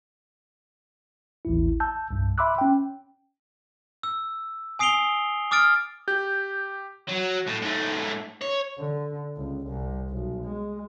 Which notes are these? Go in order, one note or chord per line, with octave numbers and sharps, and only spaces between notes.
A1 D#2 E4
A5 E6 G6
C2 G2
E5 B5 C6 D6 E6 F#6
C#4 G5
E6
G#5 D#6 C7 D7 F7 G7
D6 D#6 F6 A6 D7
G4 G6
F#3
A2
G#2 A3
C#5
D3
C#2
C2
B1
G#3